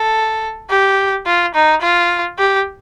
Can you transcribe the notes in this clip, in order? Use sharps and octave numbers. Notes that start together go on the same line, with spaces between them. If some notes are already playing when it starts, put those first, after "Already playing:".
Already playing: A4
G4
F4
D#4
F4
G4